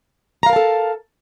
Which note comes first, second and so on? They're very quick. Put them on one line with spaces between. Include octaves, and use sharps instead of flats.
A#5 F5 A#4 A5 A4